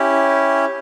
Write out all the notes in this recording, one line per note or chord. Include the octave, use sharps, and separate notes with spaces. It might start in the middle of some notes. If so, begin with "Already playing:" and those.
Already playing: C#4 E4 G4